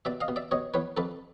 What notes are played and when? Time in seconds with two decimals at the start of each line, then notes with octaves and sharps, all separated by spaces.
0.05 B2 D5 E5
0.21 D#5 F5
0.28 B2
0.36 D5 E5
0.51 B2 C#5 D#5
0.74 E2 B4 C#5
0.97 F2 A4 B4